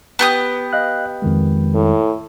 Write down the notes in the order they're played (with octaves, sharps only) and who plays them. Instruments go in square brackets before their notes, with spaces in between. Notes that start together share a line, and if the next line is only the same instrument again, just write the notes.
[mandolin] B3 G4 D#6
[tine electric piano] D#5 F5 F#6
F2 D#3 G#3
[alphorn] A2